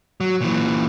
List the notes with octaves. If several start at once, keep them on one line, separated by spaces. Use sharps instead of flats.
F#3
A#2 E3